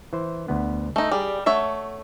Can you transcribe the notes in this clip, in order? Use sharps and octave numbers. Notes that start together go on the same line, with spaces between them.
E3 C5
D2 B3
A3 D#4
G3 G4 G#4 D5
A3 C#5 E5 F#5 A5